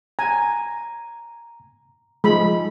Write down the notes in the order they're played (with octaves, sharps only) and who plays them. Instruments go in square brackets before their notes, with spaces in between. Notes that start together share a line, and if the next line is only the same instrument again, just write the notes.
[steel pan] G#5 [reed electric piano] A#5
[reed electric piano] F3 [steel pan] G#3 B5